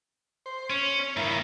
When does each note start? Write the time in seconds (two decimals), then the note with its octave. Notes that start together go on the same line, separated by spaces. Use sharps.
0.46 C5
0.70 C#4 C#5
1.17 G2 D#3 A#3 E4 B5